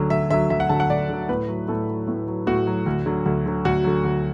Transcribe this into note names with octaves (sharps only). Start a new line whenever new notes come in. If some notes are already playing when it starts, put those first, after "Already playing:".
Already playing: D2 D3 F#3
D2 E5
D3 F#3 E5
D2 E5
F#5
D3 F#3 A5
F#5
D2 D5
D3 F#3
A2 B4
F#3
A2 A4
F#3
A2
F#3
A2 F#4
F#3
D2
D3 F#3
D2
D3 F#3
D2 F#4
D3 F#3
D2